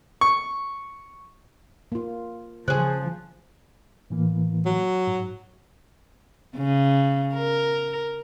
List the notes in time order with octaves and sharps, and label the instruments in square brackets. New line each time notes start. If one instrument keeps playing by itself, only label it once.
[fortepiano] C#6
[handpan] A#3 F4
[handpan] C#3 C5 [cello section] F3 [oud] C#4 G#4 [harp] F#6
[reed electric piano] A2 E3 A#3
[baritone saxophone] F#3
[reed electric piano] G#2
[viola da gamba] C#3
A#4